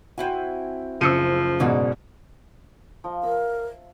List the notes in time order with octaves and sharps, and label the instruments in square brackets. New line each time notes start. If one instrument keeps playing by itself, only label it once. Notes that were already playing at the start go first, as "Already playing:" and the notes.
[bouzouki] C4 E4 G#5 [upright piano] F#4 G5
[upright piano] F#1 C#3 [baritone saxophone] F3 [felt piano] E6 C#7 D#7
[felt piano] G#2 B2 G#3 [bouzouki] A#3 D#4 D5
[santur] F3 D#5
[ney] A#4 [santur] E5 E6